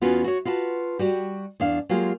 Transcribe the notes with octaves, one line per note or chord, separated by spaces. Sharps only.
E2 B3 C#4 F4 F#4
F#4 C#5
F4 F#4 B4 A5
G3 F#4 G4
E2 D4 F5
F#3 G#3 A#3 F4 G4